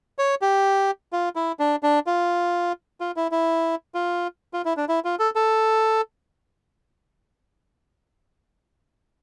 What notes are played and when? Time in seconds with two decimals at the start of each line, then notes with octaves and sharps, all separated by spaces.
0.19 C#5
0.42 G4
1.13 F4
1.36 E4
1.59 D4
1.83 D4
2.07 F4
3.00 F4
3.17 E4
3.31 E4
3.95 F4
4.54 F4
4.65 E4
4.77 D4
4.89 E4
5.04 F4
5.19 A4
5.36 A4